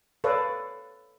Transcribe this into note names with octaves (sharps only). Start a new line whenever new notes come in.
A4 B4 C#5 D5 F5